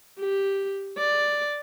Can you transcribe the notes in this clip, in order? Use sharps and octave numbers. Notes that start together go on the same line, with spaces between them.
G4
D5